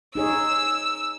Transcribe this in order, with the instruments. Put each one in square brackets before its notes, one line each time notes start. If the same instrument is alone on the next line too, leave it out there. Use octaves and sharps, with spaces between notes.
[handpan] D#4 G#4 C#5 [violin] E6